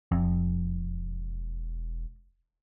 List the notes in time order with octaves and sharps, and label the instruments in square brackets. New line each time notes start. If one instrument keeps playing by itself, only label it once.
[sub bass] E1 [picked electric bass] F2